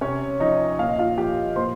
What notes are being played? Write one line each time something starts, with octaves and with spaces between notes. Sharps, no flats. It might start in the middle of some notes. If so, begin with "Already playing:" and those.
C3 C#4 C#5
F3 D#4 D#5
A#2 F5
D#5
F4 F5
F3 G4 G5
A#2 C5 C6